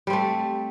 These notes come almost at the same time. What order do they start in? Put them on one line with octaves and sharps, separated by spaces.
G3 C4 A3